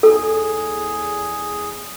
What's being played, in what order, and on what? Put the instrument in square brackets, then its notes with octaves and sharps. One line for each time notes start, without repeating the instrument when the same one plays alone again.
[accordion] E2 G#4 [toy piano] A4